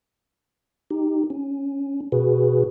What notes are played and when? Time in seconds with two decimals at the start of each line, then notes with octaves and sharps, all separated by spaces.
0.91 D#4 G4
1.30 C#4
2.12 B2 F#4 G#4 B4